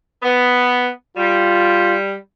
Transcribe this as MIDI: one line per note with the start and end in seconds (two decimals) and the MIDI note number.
0.23 0.87 59
1.17 2.14 55
1.17 1.96 65